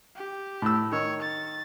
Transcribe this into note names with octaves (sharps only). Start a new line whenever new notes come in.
G4
A2 E6
D#3 C#5 E6
A6